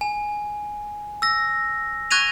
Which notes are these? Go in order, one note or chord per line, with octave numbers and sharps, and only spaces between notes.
G#5
E6 A#6
C#6 F#6 G#6 A#6 D#7 F7